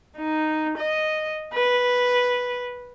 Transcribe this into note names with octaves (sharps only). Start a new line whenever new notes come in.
D#4
D#5
B4